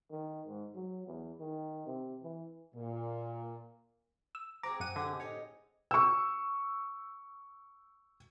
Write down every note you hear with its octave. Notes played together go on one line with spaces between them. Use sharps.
D#3
G#2
F#3
E2
D#3
C3
E3
A#2
E6
C4 F#4 G#4 A#5 D6
F#2 F#5 D#7
D3 G4 G#4 D#5
A2 D#4 C#5 D#5
C#6 E6